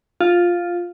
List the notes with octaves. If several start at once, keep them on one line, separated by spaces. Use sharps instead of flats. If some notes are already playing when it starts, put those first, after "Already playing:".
F4